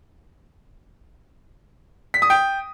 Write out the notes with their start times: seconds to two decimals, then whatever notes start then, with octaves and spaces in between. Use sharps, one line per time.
2.14 B6
2.22 D#6
2.30 G5